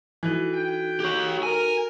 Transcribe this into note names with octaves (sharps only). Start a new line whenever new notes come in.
E3 D#4 F#4 A4
G5
G4 C#5
A#4 G#5